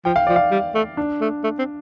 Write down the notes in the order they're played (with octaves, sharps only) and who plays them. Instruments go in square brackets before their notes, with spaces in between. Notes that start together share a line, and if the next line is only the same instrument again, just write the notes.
[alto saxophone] F3 [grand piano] G5
[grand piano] F5
[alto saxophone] F3 [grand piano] D5
[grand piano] F5
[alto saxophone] G3
A3
[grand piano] D4
[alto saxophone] A3
A3
C4